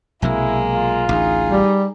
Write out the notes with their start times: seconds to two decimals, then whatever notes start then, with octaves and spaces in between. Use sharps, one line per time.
0.22 B1 C3 F#3 G#3 A#3 E4
0.75 F4
1.09 A1 D2 D#4 G#4
1.50 G3